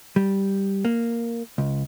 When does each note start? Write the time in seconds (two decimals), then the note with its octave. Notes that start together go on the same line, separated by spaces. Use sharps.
0.16 G3
0.85 A#3
1.58 C#2